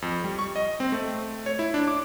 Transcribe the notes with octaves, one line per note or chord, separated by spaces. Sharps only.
F2
G3
C#6
D#5
C4
A3
C#5
E4
D4
D6